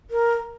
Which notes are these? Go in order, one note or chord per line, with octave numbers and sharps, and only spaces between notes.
A#4